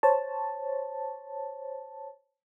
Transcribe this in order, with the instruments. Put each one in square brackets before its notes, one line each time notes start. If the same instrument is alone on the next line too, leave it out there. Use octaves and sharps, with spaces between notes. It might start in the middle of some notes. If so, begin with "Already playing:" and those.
[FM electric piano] C5 C#5 A5